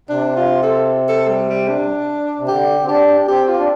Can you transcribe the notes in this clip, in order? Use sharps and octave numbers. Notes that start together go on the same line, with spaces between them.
C3 D4
F4
A4
A4
G3
G3
D4
C3
D3 G4
C4
D4 G4
C4 G4
F4
D4